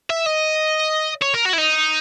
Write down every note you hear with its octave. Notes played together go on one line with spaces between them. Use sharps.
E5
D#5
C#5
A#4
F#4
E4
D#4